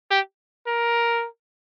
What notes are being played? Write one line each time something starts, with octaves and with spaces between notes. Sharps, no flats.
G4
A#4